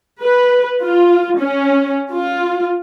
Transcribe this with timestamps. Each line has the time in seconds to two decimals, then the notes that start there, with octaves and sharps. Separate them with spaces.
0.20 B4
0.82 F4
1.39 C#4
2.11 F4